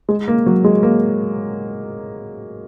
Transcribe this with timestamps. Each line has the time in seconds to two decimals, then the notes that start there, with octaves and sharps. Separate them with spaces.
0.09 G#3
0.28 A#3
0.46 F#3
0.64 G#3
0.83 A#3